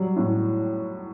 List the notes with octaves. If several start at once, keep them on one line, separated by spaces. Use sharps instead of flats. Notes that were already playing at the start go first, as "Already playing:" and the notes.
Already playing: F#3 G3
A2